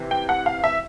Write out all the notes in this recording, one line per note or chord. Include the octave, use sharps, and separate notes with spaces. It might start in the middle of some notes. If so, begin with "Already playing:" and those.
Already playing: C3 E3
G5
F#5
F5
E5